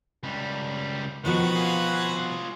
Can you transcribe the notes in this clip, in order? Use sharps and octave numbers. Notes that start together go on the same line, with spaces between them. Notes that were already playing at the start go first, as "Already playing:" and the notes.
C#2 G3
B2 D#3 F3 B3 F#4 B4
F4 G#4